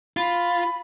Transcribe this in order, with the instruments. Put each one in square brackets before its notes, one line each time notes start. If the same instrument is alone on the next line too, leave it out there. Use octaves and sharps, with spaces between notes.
[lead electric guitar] F4 [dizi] B5